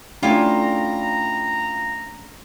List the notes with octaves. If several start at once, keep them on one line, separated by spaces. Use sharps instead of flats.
A3 C#4 D4 E4 F4 G4 A#5